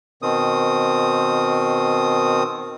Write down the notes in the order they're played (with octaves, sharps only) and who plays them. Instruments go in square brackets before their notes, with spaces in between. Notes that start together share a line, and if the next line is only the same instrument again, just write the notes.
[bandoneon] B2 D#3 C4 D#6